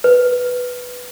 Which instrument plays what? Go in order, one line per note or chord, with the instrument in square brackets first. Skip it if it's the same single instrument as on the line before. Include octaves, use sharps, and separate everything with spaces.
[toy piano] B4